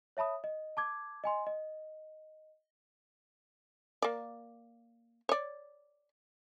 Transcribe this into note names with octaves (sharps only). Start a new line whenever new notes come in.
C#5 E5 A5 B5 D#6
D#5
A5 D6 G#6
D#5 G#5 C6
D#5
A#3 D5
C#5 D5